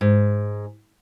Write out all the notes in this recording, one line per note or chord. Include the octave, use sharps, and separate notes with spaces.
G#2